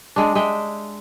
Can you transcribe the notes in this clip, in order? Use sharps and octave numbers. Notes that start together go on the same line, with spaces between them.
G#3 D4
G#3 E5 G5